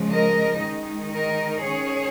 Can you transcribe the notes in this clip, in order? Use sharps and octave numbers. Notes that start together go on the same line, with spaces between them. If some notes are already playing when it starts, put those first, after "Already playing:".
Already playing: C#3 F3 G#3
A#4 D#5
D#3 G#3 D#4
A#4 D#5
D#3 C#4 G#4 C#5